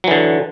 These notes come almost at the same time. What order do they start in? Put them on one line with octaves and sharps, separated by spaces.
F#3 E3 D3